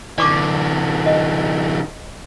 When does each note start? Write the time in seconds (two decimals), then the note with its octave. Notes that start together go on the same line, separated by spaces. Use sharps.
0.18 D3 E3 D5 C#6 D6
1.06 D#5